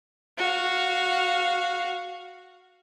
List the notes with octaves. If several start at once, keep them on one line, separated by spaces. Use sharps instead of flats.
F#4 F5